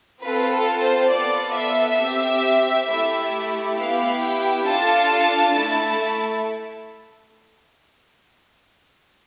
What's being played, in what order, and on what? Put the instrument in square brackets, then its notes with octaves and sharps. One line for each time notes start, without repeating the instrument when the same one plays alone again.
[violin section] C4 F4 A4 B4
A4
C5
B3 F4 A4 D5
E5
C4 G4
A3 E4 G4
B3 E4 G4 F5
G5
D4 F4 A4 A5
A3 E4